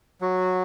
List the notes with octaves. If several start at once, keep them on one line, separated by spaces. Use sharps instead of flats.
F#3 F#4